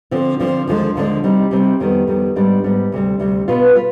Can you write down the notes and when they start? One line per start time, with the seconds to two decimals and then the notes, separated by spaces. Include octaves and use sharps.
0.11 D3 F3 C4
0.40 D3 F3 C4
0.68 D#2 D3 F3 G#3 D4
0.95 D#2 D3 F3 G#3 D4
1.23 C3 G3 C4 D#4
1.51 C3 G3 C4 D#4
1.80 F2 D#3 G3 B3
2.07 F2 D#3 G3 B3
2.36 G#2 G3 B3 D4
2.64 G#2 G3 B3 D4
2.92 D2 C3 G3
3.20 D2 C3 G3
3.48 B2 B3 F4 B4
3.76 F4 B4